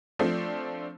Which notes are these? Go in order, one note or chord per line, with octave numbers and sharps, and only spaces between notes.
F3 A3 C4 D4